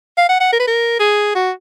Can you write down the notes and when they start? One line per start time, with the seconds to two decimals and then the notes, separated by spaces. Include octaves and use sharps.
0.18 F5
0.29 F#5
0.40 F#5
0.52 A#4
0.60 B4
0.67 A#4
1.00 G#4
1.35 F#4